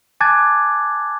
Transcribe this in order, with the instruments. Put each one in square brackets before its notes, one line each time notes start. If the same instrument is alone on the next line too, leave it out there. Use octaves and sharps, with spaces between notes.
[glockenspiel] G#5 A5 D6 F#6 G#6 A6